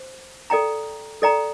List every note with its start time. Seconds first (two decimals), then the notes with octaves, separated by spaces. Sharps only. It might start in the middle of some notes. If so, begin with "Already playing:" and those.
Already playing: C5
0.50 A4 D5 G5 A#5
1.22 A4 D5 G5 A#5